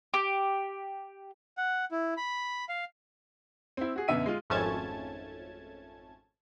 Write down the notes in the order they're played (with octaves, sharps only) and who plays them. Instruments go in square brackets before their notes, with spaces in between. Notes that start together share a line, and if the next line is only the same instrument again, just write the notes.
[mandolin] G4
[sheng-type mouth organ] F#5
E4
B5
F5
[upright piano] C4 E4
F#4 G#4
F#2 B2 D3 E5 D#7
G#3 F4
[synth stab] G#1 F2 A3 C#4 A5 G#6